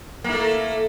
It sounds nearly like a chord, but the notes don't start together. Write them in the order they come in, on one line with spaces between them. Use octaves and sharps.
A#3 E4 A3